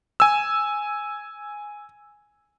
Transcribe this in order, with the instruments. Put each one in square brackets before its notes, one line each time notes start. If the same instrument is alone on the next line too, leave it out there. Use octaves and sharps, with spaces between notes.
[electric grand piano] G#5 E6